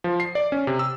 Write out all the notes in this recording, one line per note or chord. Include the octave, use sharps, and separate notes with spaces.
F3
C7
D5
C#4
C3
E6